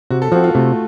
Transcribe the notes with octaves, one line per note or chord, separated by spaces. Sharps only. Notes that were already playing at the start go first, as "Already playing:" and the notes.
C3 F#4
A4
F3 C4 F#4
F4
C3 A3